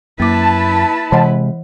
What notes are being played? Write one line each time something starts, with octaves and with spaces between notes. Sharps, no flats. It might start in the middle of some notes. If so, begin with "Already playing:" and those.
F#2 A#3 E4 B4 A5 D6
C3 E3 G#3 D#5 F#5